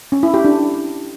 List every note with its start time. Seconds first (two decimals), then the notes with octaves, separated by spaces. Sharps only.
0.12 C#4
0.23 E4
0.34 G4
0.45 D4